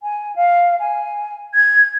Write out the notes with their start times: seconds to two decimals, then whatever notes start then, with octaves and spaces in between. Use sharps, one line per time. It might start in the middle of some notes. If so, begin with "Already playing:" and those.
0.01 G#5
0.35 F5
0.79 G#5
1.54 G#6